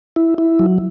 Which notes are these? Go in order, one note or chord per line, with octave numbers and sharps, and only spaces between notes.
E4
E4
F#3